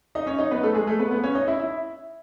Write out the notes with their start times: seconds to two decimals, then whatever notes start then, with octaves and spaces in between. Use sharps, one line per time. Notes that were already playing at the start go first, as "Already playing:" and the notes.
0.15 D#4 D#5
0.26 C#4 C#5
0.38 D#4 D#5
0.51 B3 B4
0.63 A3 A4
0.75 G#3 G#4
0.87 A3 A4
0.99 B3 B4
1.11 B3 B4
1.24 C#4 C#5
1.35 D#4 D#5
1.48 E4 E5
1.59 E4 E5